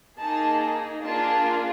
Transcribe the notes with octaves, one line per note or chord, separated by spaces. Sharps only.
A#3 D#4 G#4 A5
A#3 D4 F4 G#4 A5